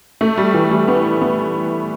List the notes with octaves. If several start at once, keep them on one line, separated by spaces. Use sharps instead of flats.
A3
G3
E3
G3
B3
B3